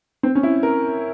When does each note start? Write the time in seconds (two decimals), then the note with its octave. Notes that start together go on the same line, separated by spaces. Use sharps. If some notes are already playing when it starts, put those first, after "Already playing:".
0.23 C4
0.35 C#4
0.43 E4
0.63 A#4